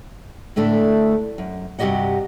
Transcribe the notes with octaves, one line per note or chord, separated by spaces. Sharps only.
A2 D3 A3 D4 E4
F#2
G2 C3 F#4 G4 D#5 F#5